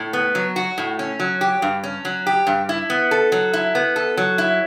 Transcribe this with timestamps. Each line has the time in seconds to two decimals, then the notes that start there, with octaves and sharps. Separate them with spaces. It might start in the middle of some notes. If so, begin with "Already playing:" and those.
Already playing: A2
0.13 B3
0.35 F#3
0.56 F#4
0.78 A2
0.99 C#4
1.20 F#3
1.41 G4
1.62 G2
1.83 C#4
2.05 F#3
2.27 G4
2.47 G2
2.69 E4
2.90 B3
3.11 A4
3.32 F#3
3.53 E4
3.75 B3
3.96 A4
4.17 F#3
4.38 E4